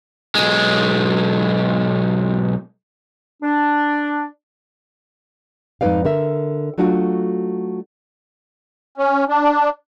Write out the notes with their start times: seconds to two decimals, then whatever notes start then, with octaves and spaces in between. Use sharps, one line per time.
0.35 B1 G#3
3.43 D4
5.81 F2 G#2 D#4 B4 D5 F5
6.05 D3 A#4 E5
6.78 F#3 A3 D4 F4 F#4
8.98 C#4
9.29 D4